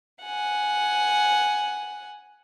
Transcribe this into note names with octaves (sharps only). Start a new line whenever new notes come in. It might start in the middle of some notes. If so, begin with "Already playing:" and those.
F#5 G#5